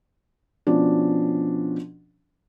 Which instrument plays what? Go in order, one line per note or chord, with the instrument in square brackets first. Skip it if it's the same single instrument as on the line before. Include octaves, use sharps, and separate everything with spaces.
[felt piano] B2 F3 C#4 D4